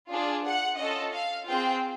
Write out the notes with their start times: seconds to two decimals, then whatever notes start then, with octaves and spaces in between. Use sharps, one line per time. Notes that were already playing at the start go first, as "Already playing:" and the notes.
0.10 D4 F4 G#4
0.44 F#5
0.78 C#4 F4 A4 D#5
1.13 F5
1.47 C4 F4 G#4 G5